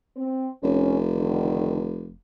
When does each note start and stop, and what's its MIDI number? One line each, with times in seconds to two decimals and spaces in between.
0.17 0.48 60
0.63 2.16 29
0.63 0.96 61
1.14 1.82 50
1.14 1.82 51